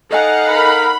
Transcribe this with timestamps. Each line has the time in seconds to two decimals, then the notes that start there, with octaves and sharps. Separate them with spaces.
0.11 D#4 A4 D#5 F5 F#5 G#5
0.50 A#4 B5